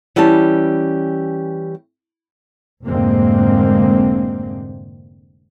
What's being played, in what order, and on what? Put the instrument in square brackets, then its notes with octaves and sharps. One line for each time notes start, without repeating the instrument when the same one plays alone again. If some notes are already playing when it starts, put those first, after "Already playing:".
[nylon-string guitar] E3 G3 C#4 G4 A5
[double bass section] F1 G#2 D3 G#3 A#3 C4